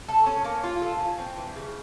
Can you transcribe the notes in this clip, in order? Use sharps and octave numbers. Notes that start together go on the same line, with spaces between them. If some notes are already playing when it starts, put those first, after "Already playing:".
A4
C#4
A#3
F4
A4
C#4
C4
E3
C#3